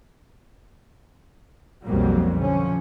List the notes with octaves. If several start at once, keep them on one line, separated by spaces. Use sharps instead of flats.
B1 F2 B2 F#3 G3 A#3
D3 F3 C#4